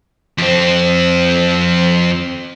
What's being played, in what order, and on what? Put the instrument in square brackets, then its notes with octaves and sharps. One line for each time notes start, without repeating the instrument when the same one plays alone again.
[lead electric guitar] F2 C4